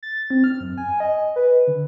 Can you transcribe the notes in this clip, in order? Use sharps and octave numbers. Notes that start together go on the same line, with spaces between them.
A6
C4
F6
F#2
G#5
D#5
B4
D3